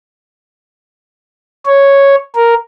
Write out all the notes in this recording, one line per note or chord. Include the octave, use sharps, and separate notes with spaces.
C#5
A#4